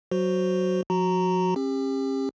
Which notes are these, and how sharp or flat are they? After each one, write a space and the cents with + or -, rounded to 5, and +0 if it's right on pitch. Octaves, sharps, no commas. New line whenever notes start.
F#3 +10 F#4 +0 C5 -5
F3 +40 F#4 +0 A#5 -5
C#4 -45 G4 +30